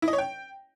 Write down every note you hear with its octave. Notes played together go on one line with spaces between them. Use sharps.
E4
D#5
C#5
G5